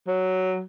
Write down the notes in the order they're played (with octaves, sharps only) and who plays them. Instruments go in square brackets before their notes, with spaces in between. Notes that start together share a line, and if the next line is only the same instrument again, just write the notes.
[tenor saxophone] F#3